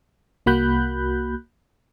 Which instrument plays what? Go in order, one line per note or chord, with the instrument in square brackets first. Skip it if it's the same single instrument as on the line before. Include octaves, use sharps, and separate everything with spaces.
[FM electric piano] C2 A#3 F#4 B5 F#6 G6